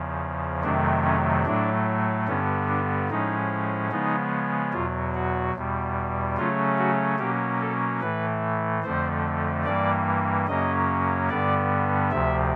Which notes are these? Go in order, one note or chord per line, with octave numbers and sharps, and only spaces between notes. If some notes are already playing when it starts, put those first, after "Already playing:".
Already playing: E2 C#3 F3
F2 C3 D#3 F#3 A3 D4
C#4
A2 F#3 A3 D4
G2 D3 G3 B3 C#4
D4
A2 F3 G#3 C#4 D#4
C#3 F3 G#3 B3 D#4
E2 B2 F#3 F4
F#4
E2 B2 G3
C#3 F#3 A3 C#4 F4
F#4
B2 F#3 A#3 C#4 G4
A4
A2 E3 A3 B4
F2 D3 F3 A3 C5
G2 E3 G3 A#3 D5
F#2 C#3 F#3 A#3 C#4 D#5
G2 D3 G3 B3 D5
D2 C3 F3 E5